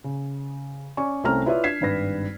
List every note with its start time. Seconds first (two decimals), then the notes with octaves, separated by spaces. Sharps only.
0.04 C#3
0.97 C#4 D5 G#5 C#6
1.24 C2 A3 C4 C#4 A#5 F6
1.46 E4 F4 B4 C#5 D5 E5
1.64 D4 G#6 B6 C7 E7
1.81 G#1 G2 B4 A#6